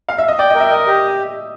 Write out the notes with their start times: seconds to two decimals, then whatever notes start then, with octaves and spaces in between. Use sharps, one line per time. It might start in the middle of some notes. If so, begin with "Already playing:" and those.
0.09 F5
0.18 E5
0.28 D#5
0.39 D5 G5
0.50 D#5
0.55 A#4
0.60 E5
0.70 D#5
0.87 G4